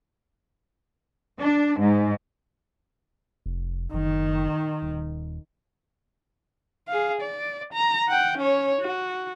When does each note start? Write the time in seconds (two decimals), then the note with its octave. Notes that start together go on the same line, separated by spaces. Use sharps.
1.39 D4
1.80 G#2
3.46 F1
3.94 F#1 D#3
4.82 D#1
6.88 G#4 F5
7.21 D5
7.73 A#5
8.09 F#5 G5
8.38 C#4 C#5
8.81 F#4